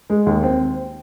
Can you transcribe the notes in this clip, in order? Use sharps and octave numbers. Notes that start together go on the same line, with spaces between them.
G#3
D#2
C4